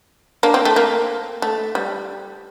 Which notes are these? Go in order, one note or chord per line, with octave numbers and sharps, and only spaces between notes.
A#3 D4
C4
A3
A#3
A3
G3